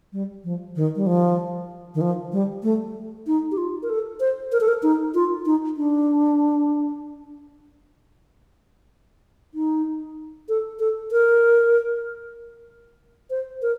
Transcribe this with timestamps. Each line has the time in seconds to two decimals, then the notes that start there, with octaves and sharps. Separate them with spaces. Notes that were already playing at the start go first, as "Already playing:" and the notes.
0.13 G3
0.44 F3
0.76 D#3
0.96 G3
1.07 F3
1.95 D#3
2.01 F3
2.32 G3
2.63 A3
3.27 D#4
3.51 G4
3.58 F4
3.83 A#4
3.90 A4
4.20 C5
4.52 A#4
4.61 A4
4.68 A#4
4.83 D#4
5.15 F4
5.46 D#4
5.77 D4
9.54 D#4
10.49 A4
10.79 A4
11.12 A#4
13.30 C5
13.62 A#4